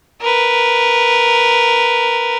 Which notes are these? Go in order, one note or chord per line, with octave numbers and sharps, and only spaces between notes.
A#4 B4